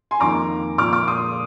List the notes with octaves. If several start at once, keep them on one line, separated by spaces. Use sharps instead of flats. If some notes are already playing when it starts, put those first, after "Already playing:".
G#5 C6
F2 D#3 A#3 A#5 D6
A#2 F3 A#3 D6 F6
D6 F6
C6 D#6